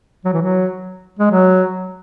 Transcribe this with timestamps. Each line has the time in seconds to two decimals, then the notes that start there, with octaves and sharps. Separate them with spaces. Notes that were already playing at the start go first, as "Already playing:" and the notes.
0.25 F#3
0.33 E3
0.41 F#3
1.19 G#3
1.31 F#3